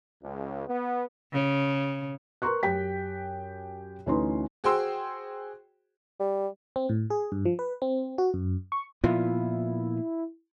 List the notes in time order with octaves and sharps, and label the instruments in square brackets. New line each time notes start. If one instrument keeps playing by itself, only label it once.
[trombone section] C#2
B3
[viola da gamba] C#3
[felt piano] A#4 B4 A#5 C6 C#6 F#6
F#2 G4 G5 B6
D2 E3 C#4 D#4 B4 C6
[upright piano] F#4 G#4 C5 G5 C6 E6
[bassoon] G3
[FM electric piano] C4
A2
G#4
G2
F3
B4
C4
F#4
F#2
C#6
[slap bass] A#2 F3 B3 [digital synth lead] E4 [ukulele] F4